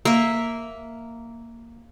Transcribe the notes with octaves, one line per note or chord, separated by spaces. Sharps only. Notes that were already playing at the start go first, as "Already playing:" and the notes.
A#3 E5